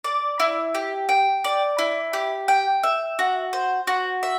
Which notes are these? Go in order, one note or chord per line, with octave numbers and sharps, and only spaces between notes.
D5
E4
G4
G5
D5
E4
G4
G5
E5
F#4
C5
F#4
E5